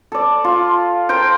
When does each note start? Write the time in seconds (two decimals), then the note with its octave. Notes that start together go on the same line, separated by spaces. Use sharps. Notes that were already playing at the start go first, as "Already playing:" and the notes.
0.12 A4 D5
0.44 F4
1.09 A#4 C5 G5